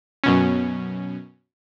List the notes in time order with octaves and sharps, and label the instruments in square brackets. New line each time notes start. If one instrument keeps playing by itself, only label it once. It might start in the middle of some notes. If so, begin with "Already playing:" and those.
[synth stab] F#2 B2 C#4